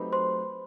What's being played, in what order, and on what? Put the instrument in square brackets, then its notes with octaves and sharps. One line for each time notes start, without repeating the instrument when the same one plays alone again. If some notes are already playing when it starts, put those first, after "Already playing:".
Already playing: [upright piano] F#3 A3 C4 D#4 G4 [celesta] B4 B5
[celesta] C5 C6